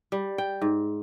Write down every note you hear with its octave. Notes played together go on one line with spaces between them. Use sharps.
G3
G5
G#2